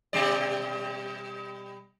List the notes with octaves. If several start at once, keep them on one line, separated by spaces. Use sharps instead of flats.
B2 G3 D5